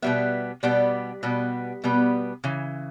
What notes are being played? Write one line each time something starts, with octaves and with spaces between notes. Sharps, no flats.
B2 G3 B3 E5
B2 G3 B3 D5
B2 G3 B3
B2 G3 B3
C#3 E3